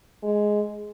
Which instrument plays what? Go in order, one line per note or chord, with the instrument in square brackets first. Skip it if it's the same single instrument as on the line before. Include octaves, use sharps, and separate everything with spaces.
[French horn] G#3